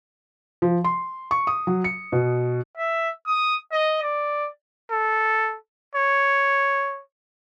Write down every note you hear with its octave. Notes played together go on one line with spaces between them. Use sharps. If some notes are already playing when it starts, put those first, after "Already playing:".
F3
C6
C#6
D#6
F#3
C#7
B2
E5
D#6
D#5
D5
A4
C#5